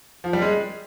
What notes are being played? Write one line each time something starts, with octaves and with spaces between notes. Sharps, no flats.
F3
G3
G#3